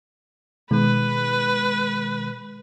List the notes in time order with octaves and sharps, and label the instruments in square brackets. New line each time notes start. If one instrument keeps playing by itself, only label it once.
[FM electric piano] B2 D#3 G#3 [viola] B4